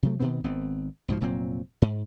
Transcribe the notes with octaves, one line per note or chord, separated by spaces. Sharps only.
C3 F#3 A3
B2 D#3 B3 C4
G#1 B3 C4
C2 G#2 B2 F3
F1 A#2 F#3 C4
G#2